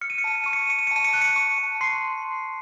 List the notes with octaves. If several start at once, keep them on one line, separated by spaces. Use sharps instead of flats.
F6 C#7
D#7
C#7
A5 D#7
C#7
C#6 D#7
C#7
D#7
C#6 C#7
D#7
C#7
A5 D#7
C#7
F#6 D#7
C#7
C#6
A5
C6 C7